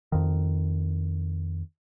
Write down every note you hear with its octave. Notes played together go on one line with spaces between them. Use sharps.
F2 D#3